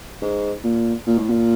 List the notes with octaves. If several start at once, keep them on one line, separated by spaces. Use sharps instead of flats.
G#2
A#2
A#2
A2
A#2